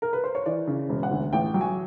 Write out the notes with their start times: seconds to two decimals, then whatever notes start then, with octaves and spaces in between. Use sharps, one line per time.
0.02 A#4
0.13 B4
0.24 C5
0.35 C#5
0.46 E3 D5
0.67 C#3
0.89 E1
1.03 F#5
1.11 D2
1.33 A1 G5
1.54 F#3 G5
1.61 G#5